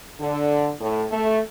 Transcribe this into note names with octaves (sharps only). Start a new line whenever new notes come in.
D3
A2
A3